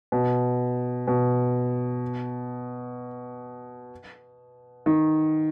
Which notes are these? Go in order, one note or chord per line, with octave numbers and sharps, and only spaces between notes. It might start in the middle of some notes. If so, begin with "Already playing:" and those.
B2
B2
D#3